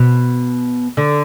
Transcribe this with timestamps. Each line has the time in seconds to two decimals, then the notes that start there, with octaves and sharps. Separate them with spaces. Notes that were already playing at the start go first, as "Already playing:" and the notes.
Already playing: B2
0.97 D3